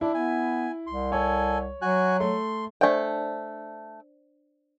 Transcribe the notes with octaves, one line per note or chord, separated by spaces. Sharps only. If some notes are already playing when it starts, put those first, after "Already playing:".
D4 E4
B3 G#5
C2 C6
A4 C#5 G#5
F#3 F#4 G#5 F#6
A3 C6
A3 D4 C5 D5 G5